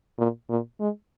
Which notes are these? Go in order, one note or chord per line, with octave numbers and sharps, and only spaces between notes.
A#2
A#2
G#3